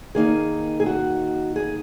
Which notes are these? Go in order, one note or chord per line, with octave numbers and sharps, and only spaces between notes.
D#3 A#3 D#4 G#4
G#4
F#4
G#4